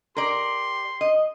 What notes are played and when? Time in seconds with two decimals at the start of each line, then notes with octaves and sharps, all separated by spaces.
0.17 G4 A#4 D5 C6
1.01 D#5